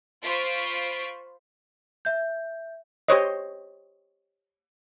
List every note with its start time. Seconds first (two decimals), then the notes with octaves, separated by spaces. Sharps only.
0.23 F4 C5 B5 C#6 B6 D7
2.05 E5 G6
3.08 G4 C5 C#5 D#5